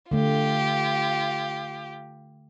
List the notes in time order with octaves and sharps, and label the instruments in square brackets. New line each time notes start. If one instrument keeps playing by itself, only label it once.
[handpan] D3 A3 [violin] F4 G4